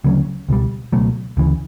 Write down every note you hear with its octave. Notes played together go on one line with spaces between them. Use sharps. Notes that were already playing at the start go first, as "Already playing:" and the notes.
D2 C#3 F#3 C#4
C#2 B2 G3
C#2 B2 F#3 A3
D2 C#3 E3